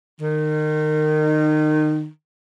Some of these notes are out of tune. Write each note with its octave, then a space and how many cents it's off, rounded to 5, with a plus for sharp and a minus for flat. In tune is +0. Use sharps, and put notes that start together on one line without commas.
D#3 -25